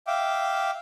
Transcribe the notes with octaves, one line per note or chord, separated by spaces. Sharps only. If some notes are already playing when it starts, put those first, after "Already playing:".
E5 F5 G5 D6